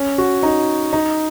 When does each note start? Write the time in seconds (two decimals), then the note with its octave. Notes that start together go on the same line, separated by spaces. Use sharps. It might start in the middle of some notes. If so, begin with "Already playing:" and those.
Already playing: C#4
0.18 F#4
0.43 D#4
0.93 D#4